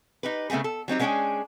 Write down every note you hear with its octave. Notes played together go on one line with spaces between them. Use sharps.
D#4 G4 B4
C#3 A3 B3 C4 G#4
A4
F#3 C4 D#4 G4
G#3 B3 C#4 D4 G#4 G5